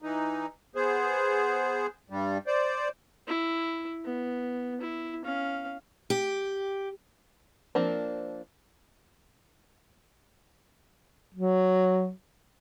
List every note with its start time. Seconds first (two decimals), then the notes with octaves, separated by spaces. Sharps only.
0.02 E3 D#4
0.75 B3 G#4 C5
2.10 G2 G3
2.47 C5 D5
3.27 E4
4.04 B3
4.81 E4
5.25 C#4 F5
6.10 G4
7.75 F3 A#3 C4 D4
11.35 F#3